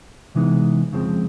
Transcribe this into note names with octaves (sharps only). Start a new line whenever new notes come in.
C3 E3 G#3 B3 D#4
F2 C#3 F3 G#3 C4